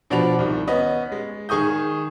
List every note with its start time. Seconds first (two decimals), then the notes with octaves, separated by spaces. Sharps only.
0.10 B2 F3 D4 F#4 B5 F7
0.39 C2 D#3
0.68 B3 C#4 D#5
1.12 G#3
1.49 D#3 G#4 C#6 D#6 G6